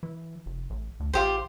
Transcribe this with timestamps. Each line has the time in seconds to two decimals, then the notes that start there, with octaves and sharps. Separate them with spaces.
0.03 E3
0.46 F1
0.70 A1
1.00 D2
1.13 A1 F4 G4 C5